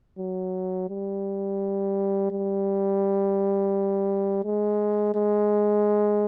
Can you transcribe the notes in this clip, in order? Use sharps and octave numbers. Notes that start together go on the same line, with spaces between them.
F#3
G3
G3
G#3
G#3